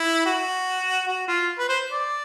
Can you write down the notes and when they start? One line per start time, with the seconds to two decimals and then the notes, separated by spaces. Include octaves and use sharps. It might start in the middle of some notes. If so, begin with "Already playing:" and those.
Already playing: E4
0.25 F#4
1.07 F#4
1.28 F4
1.59 B4
1.69 C5
1.90 D5